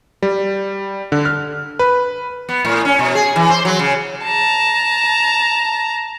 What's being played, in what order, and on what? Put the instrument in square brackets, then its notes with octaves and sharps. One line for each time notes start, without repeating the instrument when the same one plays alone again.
[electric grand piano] G3
D3
F6
B4
[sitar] B3
A2
C#4
B2
G#4
E3
C5
F#3
C#3
[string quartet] A5 A#5